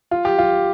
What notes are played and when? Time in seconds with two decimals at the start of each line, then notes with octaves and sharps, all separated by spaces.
0.11 F4
0.25 G4
0.38 F4